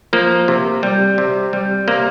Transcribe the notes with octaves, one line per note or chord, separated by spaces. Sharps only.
F3 A#3
C3
G3
C3
G3
C3 A#3